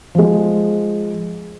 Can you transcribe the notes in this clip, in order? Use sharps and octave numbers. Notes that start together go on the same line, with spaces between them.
F3 G#3